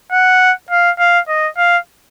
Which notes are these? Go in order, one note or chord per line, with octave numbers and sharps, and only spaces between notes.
F#5
F5
F5
D#5
F5